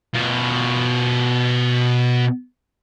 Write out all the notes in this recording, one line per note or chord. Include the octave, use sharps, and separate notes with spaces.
B2 F4